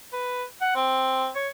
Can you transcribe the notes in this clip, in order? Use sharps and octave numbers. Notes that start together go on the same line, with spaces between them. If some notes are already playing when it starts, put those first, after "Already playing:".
B4
F#5
C4
C#5